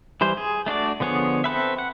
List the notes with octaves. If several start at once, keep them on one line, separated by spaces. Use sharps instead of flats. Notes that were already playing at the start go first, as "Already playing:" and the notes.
E3 G3 C5
G#4
A3 D4 F#4 D5
D3 F3 B3 G#4 C#5
C4 A4 B4 E5
F#5